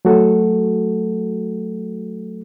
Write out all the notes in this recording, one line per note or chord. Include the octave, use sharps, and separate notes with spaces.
F#3 A3 F#4 A4